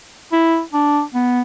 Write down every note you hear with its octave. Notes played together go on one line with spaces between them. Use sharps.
E4
D4
B3